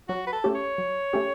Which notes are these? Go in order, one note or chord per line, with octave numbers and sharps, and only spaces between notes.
F#3 F#4
B4
A4
A3 C#4 G4
C#5
F#3
A3 C#4 G4